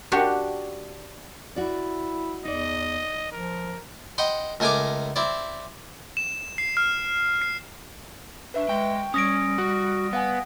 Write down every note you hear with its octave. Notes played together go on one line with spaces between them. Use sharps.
D4 F#4 G4
E4 F#4 D5
E2 D#4 D5 D#5
F3 A#4
D#5 F#5 G5 B5 C6
C#2 A3 A#4 G#5 A#5 D6
C4 E4 D5
E7
C7
F6
C7
D4 B4 E5 C#6
G#3 G5 C#6
G3 C#4 D#6 A#6 D7
F#4 F#5
B3 F5 F#5 G#5